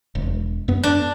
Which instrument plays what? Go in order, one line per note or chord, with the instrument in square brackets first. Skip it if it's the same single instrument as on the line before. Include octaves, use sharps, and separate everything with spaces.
[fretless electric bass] E1
F#2 B3
[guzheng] D4